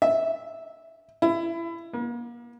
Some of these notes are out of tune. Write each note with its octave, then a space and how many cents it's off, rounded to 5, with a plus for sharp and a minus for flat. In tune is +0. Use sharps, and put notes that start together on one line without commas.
E5 -10
E4 +25
A#3 +40